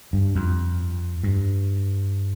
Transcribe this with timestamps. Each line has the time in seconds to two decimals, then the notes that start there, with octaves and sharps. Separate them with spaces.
0.13 G2
0.35 F2
1.24 G2